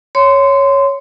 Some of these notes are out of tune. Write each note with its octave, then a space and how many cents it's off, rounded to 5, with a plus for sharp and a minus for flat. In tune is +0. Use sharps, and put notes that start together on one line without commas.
C#5 +0 C6 -20